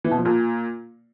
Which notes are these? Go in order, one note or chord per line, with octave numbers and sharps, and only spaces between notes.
E3
B2
F3
A#2